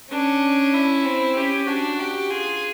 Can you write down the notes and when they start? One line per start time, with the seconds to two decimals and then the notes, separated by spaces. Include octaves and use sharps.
0.11 C#4 D4
0.73 E4
1.05 C4
1.36 C#4 G4
1.67 D4 F#4
1.99 G4
2.30 F4 G#4